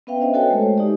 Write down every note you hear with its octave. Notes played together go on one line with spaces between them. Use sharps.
B3 C#4 B4 E5 F5 G5
D4 C5 D#5 E5
F#4 A4 B4 C#5 G5 G#5
G#3 A3
G#3 C5
D#4 G4 D5